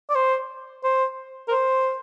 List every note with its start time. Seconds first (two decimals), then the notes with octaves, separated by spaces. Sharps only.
0.09 D5
0.15 C5
0.84 C5
1.48 A#4
1.51 C5